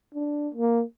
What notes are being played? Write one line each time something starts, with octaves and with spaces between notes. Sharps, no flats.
D4
A#3